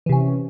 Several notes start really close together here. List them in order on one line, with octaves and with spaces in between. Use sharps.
E3 C3 C#4